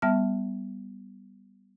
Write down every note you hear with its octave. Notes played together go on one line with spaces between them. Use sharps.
G3 B3 E5 A5 F6